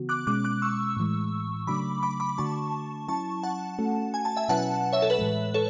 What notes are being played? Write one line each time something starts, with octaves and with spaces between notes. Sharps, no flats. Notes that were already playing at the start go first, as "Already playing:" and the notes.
Already playing: C#3 E3 B3 F#4
D6 F#6
B2 G#3 C#4 D6 F#6
D6 F#6
C#6 E6
A2 E3 G#3
C#3 F#3 A3 D4 B5 D6
B5 D6
B5 D6
D3 A3 D4 F#4 A5 C#6
F#3 C#4 E4 A5 C#6
F#5 A5
A3 C#4 F#4 A4
G#5
A5
E5 G#5
B2 F#3 C#4 E4 B4 F#5 A5
C#5 E5
A4
B4
A2 E3 G#3
A4 C#5